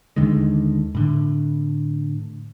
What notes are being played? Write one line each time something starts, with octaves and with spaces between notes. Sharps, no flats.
D#2 D3 D#3 G#3
A2 D3